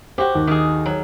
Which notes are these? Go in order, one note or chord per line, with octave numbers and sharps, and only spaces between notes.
F#4 G4 C5 G5
D#2
D#3 G#4
F#3